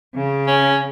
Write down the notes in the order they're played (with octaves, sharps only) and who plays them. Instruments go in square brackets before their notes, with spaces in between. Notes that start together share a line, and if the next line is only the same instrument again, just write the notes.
[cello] C#3
[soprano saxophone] C#4